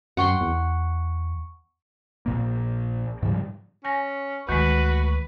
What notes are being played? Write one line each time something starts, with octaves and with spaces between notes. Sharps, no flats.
F#2 F#5 G5 C6 C#6 C#7
E2
A#1 A#2 A#3
G#2 C#3 F3 G3
C#4 G#5 A#6
D2 D#3 G#3 A3 F#4 B4